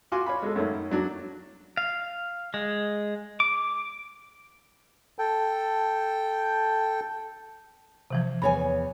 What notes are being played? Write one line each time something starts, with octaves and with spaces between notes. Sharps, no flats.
F4 F#4 G#5 C6 D6
C#5 F5 B5
G#3 A4
F#2 D#3 A3 C#4 D#4
F#3 D4 F#4
F5
G#3
D6
A4 G5
C3 E3 F3
E2 C#5 G#5 B5